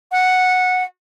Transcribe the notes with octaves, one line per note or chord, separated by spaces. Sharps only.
F#5